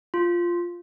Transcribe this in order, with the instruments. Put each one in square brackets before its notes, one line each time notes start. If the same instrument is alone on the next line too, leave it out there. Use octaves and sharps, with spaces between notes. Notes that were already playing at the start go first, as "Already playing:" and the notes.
[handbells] F4